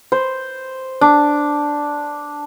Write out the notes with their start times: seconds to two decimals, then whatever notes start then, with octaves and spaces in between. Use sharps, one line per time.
0.12 C5
1.01 D4